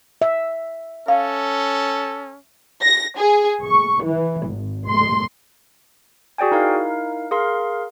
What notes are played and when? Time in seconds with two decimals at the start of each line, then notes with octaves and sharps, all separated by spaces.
0.22 E5
1.08 C#4 A4 F5
2.83 A#6
3.18 G#4
3.64 C#6
4.05 E3
4.46 G#1
4.87 C6
6.38 F#4 G#4 D5 G5 G#5
6.51 D#4 E4 A#4 F5
7.31 G#4 A#4 F5 C6